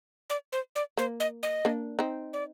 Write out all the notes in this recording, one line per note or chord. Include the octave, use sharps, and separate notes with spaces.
D5
C5
D5
A#3 C5
D#5
D#5
A#3 D4
C4 D#4
D5